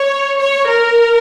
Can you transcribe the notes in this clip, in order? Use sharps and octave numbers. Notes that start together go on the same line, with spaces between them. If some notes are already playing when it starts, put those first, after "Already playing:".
Already playing: C#5
C#5
A#4